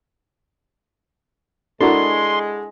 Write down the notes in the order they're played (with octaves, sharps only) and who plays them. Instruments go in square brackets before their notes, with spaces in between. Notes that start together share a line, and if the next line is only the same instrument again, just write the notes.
[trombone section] G#3 [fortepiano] D4 E4 F#4 [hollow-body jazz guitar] A4 A#4 [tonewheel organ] C6